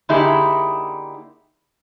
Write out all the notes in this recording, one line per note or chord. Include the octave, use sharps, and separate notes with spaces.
D3 A#3 D#4 E4 G4 G#4